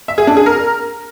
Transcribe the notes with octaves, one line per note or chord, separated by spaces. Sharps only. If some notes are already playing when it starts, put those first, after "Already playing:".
E5
G#4
D4
G#4
A#4